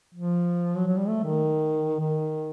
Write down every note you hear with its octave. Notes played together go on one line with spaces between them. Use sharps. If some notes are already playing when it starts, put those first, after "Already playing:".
F3
F#3
F#3
G3
A3
D#3
D#3